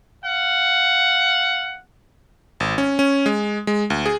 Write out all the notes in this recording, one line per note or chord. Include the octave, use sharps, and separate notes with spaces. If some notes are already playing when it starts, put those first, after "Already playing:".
F5 F#5
G#1
C#4
C#4
G#3
G#3
D2
G#4